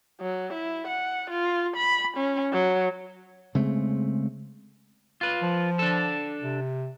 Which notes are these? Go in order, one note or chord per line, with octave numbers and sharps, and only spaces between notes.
F#3
E4
F#5
F4
B5
C#4
F#3
C#3 G#3 A3 C4
F4 B4
F3
D4 A4
C3